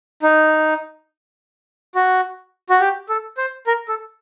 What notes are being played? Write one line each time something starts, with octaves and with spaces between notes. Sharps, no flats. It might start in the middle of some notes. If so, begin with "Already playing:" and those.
D#4
F#4
F#4
G4
A4
C5
A#4
A4